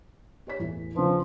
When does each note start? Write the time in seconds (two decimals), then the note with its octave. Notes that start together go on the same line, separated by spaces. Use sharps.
0.47 G4 C#5 B6
0.60 E2 A2 E3
0.95 C#3 F3 D4 B4